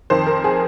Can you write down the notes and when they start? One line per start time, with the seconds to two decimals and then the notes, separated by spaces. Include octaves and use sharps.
0.10 F2 D#3 C5
0.27 A#4
0.44 G#4